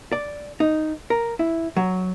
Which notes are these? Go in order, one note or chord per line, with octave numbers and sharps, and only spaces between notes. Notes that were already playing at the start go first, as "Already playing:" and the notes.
D5
D#4
A#4
E4
F#3